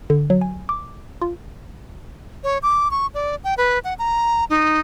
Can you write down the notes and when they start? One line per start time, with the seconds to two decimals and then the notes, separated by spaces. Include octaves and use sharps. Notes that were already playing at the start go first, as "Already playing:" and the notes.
0.10 D3
0.30 F#3
0.41 G#5
0.69 D6
1.22 F4
2.44 C#5
2.63 D6
2.91 C#6
3.14 D5
3.44 G5
3.58 B4
3.84 F#5
3.99 A#5
4.50 D#4